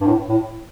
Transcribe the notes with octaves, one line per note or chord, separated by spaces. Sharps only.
G2
A2
A2